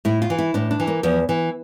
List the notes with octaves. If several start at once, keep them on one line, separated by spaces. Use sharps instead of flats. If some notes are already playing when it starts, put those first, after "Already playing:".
A2 E4
F4
E3
E4
A2 D4
D4
E3
A#3
E2 F3
E3